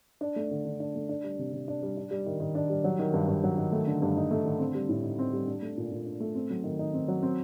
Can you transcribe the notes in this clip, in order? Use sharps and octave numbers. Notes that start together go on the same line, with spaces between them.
D4
A3
D3
D3
D4
A3
D4
G3
C3
C3
D4
G3
D4
G3
D#3
D#3
D4
G3
F#3
D#3
G2
G2
F#3
D#3
A3
D3
G2
D#4
A3
D3
C4
G3
A2
D#4
C4
G3
D4
A3
A#2
A#2
D4
A3
C4
F#3
D#3
D#4
C4
F#3
C4